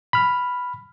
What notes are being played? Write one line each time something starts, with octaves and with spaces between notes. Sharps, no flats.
B5 F6